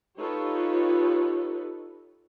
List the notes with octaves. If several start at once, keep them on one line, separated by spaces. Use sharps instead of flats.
D#4 F4 G4 A4 B4 C#5